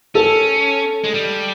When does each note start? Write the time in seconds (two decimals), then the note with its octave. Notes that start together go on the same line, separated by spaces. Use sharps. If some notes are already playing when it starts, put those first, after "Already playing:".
0.15 C#4 A4
1.04 G#3
1.14 G3